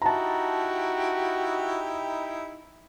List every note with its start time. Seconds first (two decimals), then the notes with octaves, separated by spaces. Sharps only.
0.02 D#4 E4 F#4 G4 A5 A#5